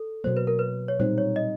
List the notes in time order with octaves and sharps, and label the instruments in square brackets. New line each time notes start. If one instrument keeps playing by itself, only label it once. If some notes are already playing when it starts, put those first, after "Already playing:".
Already playing: [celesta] A4
[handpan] B2 F#3 A#3 [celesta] C5
[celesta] B4
A#4
B4
C#5
[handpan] A#2 G3 C4 D#4 [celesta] C5
[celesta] C#5
D#5